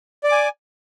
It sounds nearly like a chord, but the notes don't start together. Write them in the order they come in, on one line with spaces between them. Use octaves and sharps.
D5 D6 G#5